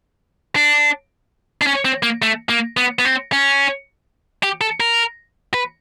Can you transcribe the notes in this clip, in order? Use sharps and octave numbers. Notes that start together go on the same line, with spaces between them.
D4
D4
C#4
C4
A#3
A3
A#3
B3
B3
C4
C#4
G4
A4
A#4
B4